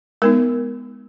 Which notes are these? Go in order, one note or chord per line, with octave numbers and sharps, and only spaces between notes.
G#3 B3 D#4 A#4